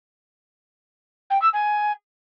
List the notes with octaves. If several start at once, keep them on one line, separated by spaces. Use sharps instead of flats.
G5
E6
G#5